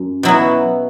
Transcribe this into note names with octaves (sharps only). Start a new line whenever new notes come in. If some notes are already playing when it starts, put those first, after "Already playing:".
Already playing: F#2
B2 F#3 B3 E4